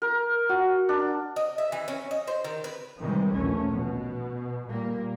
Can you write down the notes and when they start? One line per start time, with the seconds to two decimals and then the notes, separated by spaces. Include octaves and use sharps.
0.02 A#4
0.49 F#4
0.89 D4
1.36 D#5
1.58 E5
1.72 E3
1.88 C#4
2.11 D#5
2.28 C5
2.44 D#3
2.64 B4
3.00 C3 D#3 E3 G3 G#3
3.34 A#1 D#2 A3 C#4
3.70 B2
4.69 A#2 G3 A#3